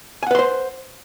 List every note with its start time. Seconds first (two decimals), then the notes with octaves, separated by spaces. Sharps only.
0.23 G#5
0.27 F#5
0.31 B4
0.35 C6
0.39 C5